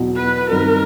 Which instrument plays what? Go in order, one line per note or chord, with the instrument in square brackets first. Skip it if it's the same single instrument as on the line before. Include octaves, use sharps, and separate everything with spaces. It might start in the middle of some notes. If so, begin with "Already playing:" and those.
Already playing: [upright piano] E2 B2 F#3
[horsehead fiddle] B4
[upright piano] G2 D#3 G3 C4 [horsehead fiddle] A#4